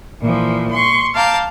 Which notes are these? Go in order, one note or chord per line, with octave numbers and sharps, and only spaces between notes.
A#2 E3 F3
C6 C#6
F5 A5 A#5 D6 G6